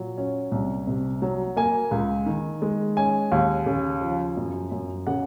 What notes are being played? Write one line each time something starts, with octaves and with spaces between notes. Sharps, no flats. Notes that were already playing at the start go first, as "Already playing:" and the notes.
Already playing: A#2 F#3
C#4
C2
C3
F#3
A#3 G#5
C#2
D#3
G#3
C#4 G#5
D#2
C#3
F3
F#2
F#2
C#3 F#5